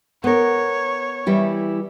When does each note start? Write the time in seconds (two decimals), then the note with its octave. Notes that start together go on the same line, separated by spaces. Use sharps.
0.24 B3 A#4 C#5
1.26 E3 G3 E4